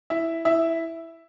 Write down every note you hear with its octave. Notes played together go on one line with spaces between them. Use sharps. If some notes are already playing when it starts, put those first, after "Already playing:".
E4 E5
E4 E5